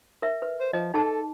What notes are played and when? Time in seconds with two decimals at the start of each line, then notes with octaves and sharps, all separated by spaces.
0.22 A#4 E5
0.42 B4
0.61 C5
0.73 F3 D#5
0.94 D#4 G#4 A4 A5